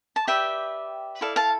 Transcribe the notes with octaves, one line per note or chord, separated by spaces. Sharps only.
A5
G4 B4 D5 E5 G5
E4 A4 D5 F5
F5 A5